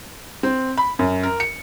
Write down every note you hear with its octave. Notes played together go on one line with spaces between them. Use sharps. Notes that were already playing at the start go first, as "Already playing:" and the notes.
C4
B5
F#2
A#4
C#7